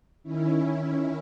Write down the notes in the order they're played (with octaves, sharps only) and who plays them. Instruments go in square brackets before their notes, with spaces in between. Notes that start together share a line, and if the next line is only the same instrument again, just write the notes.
[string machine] D#3 C#4 E4